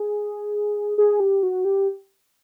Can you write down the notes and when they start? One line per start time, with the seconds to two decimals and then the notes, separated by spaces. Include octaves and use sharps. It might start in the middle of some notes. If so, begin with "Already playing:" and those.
Already playing: G#4
0.98 G#4
1.20 G4
1.43 F#4
1.65 G4